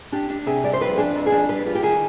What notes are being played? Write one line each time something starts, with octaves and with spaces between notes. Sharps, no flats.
D4 G4
D4
C3 G#4
G3 D5
C5
F2 B4
D4 G#4
B4
F2
G#4
D4
G3 B4
F4
G4
D#3 G#4